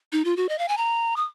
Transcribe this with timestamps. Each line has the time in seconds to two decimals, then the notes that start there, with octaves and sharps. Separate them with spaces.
0.12 D#4
0.25 F4
0.37 F#4
0.49 D#5
0.59 F5
0.68 G#5
0.77 A#5
1.16 D#6